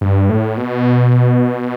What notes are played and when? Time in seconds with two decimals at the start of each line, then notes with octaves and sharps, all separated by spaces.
0.01 G2
0.29 A2
0.57 B2